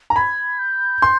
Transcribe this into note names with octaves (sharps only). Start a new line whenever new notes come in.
A#5
B5 G#6
G6
C6